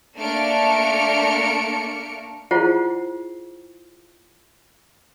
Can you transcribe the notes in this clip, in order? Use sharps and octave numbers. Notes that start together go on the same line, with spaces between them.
A3 A#3 D4 F6 C#7 D7
E4 F4 G#4 C5 F#5 A5